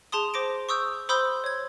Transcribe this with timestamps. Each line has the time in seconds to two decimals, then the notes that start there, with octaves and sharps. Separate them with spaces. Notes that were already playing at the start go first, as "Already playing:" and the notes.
0.12 G#4 A5 C6 D#6
0.34 C5 D6 A#6 D7
0.69 C#6 D#6 E6 G6
1.09 C5 B5 C6 D#6 E6 G6
1.44 C#5 G#6